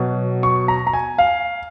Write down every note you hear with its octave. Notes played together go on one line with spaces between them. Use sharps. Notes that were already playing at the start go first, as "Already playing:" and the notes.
Already playing: B2 F#3
C#6
A#5
A#5
G#5
F5